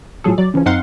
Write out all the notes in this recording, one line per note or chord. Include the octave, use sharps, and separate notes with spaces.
A2 F3 F#3 G#4 A4
F#3 D5
C#3 E3 F3 C#4
F#2 C4 D#4 F5 F#5 C6